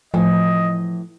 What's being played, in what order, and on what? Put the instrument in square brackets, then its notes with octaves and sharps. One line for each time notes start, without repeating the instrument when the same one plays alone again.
[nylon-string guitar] A2 E3 G#5 [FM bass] F3 [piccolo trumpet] D#5